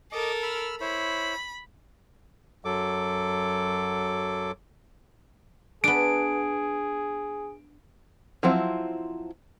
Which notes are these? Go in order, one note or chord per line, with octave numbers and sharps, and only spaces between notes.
A4 A#4 D#5 D6
B5 E6 F6
E4 C5 C#5 B5
F#2 F#3 A4 D6
B3 D4 G#4 D7
F3 F#3 C4 E4